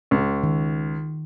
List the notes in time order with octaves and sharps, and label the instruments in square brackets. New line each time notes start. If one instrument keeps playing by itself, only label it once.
[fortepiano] C#2
[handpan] D#3